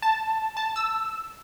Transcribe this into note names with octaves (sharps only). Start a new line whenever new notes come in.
A5
A5
E6